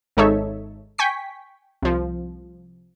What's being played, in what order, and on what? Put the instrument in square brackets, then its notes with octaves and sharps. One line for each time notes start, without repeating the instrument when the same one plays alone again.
[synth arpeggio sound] G#1 G#2 D#4 A4 C#5 E5
G5 G#5 C#6 B6
C2 F3